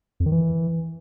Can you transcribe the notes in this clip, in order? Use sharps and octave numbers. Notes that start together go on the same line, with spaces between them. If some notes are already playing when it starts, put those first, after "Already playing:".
F2
D#3
E3